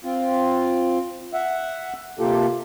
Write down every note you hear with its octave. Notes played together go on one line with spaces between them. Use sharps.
C4 F4
E5 F#5
C3 A#3 F4 G4 A4